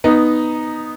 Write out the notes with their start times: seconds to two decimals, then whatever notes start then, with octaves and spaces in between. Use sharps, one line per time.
0.04 B3 D#4